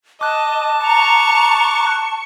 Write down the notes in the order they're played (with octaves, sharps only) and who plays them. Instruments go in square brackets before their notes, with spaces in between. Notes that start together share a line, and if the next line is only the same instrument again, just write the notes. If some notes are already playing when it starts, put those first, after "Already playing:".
[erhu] D#5 [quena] A5 [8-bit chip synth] D6 F#6
[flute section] A#5 [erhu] C#6